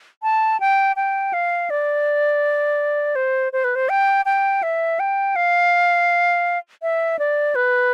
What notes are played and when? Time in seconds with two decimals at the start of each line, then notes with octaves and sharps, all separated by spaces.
0.23 A5
0.60 G5
0.96 G5
1.33 F5
1.70 D5
3.15 C5
3.53 C5
3.64 B4
3.75 C5
3.89 G5
4.25 G5
4.63 E5
4.99 G5
5.36 F5
6.82 E5
7.19 D5
7.55 B4